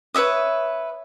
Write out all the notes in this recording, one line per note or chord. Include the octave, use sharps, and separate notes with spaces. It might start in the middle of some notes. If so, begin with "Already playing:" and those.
B4 C#5 E5 D#6